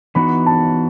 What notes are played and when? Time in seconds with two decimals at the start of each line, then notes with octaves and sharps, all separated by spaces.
0.15 E3 B3 D#4 F#4 B5
0.46 A5